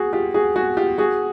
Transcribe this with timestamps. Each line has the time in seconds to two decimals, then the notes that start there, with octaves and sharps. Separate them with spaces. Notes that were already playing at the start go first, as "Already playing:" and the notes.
Already playing: F#4 G#4
0.13 F4 G4
0.34 F#4 G#4
0.56 F#4 G#4
0.77 F4 G4
0.98 F#4 G#4